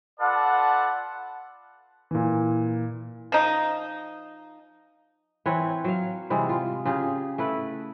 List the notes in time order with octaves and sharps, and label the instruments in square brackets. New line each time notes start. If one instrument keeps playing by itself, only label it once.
[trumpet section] F4 A4 B4 D5 F#5 A5
[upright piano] A#2 E3
[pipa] F3 D#4
[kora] E3 C4 B4 C#5
F#3 F5
C3 E3 G3 G#3
F4
C#3 F4 G4 G#4
A3 E4 B4